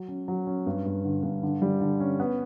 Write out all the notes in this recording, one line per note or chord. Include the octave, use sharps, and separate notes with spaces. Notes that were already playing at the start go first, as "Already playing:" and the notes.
Already playing: F#3
C#4
F#3
C#4
G2
G2
D3
G2
D3
G3
D3
C#4
B3